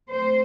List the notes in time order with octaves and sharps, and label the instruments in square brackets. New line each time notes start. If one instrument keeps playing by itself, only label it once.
[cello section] A3 C4 C5